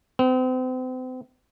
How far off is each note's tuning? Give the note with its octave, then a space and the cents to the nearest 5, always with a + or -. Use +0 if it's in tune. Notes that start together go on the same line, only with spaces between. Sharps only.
C4 -40